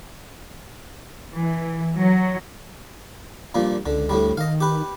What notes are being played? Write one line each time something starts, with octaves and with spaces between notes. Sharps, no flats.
E3
F#3
G2 A#2 F3
C#2 D3
D2 A2 D3 G3
D#3 D#5 F5
G4 B4